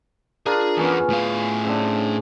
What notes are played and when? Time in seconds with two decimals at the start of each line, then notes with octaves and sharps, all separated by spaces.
0.46 D4 F4 G#4 A#4
0.77 E2 B3 C#4 G#4
1.10 A2 F5
1.64 C#3 C4 D4